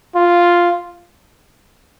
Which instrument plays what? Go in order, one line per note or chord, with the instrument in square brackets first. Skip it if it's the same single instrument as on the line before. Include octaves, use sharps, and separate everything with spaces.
[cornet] F4